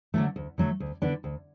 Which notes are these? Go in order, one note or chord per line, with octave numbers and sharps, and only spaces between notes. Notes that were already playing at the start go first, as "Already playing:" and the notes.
D3 F#3 A3
D2
D3 F#3 A3
D2
D3 B3 D4
D2